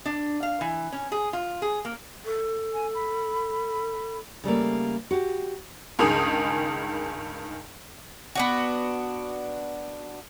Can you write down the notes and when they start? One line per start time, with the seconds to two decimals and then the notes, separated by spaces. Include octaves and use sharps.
0.06 D4
0.43 F5
0.61 E3
0.92 C#4
1.12 G#4
1.33 F4
1.62 G#4
1.85 A#3
2.25 A4
2.73 G#5
2.94 B5
4.44 C#3 G3 A3 A#3
5.11 F#4 G4
5.99 C#2 G2 D#3 G#4 D#6 F7
8.35 B3 D4 F#4